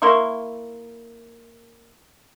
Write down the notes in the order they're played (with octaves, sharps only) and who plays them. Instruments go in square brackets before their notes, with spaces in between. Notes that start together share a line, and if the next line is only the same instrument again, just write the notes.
[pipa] A#3 E4 C6 C#6